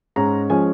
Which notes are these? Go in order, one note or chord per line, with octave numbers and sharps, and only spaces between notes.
G#2 G#3 C#4 A#5
F3 G#3 C#4 G#5